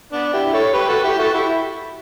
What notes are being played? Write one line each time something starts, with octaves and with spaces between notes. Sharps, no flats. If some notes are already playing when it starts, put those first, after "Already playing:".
B3 D4
E4 G4
A4 C#5
G4 B4
F#4 A4
E4 G4
F#4 A4
E4 G4